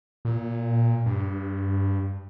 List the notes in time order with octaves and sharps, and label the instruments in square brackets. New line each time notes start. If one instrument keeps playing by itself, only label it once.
[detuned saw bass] A#2
G2